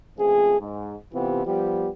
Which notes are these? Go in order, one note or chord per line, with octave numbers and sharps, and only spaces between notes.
C#2 F3 A3 C4 G#4
G#2
C3 E3 B3 C4 F4 G4
F3 G3 B3 G4